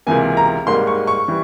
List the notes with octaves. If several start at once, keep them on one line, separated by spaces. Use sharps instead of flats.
C#2 C3 E3 A#3 G#5
A#5
G#2 G3 A#3 C6
C#6
C#6
E3 G3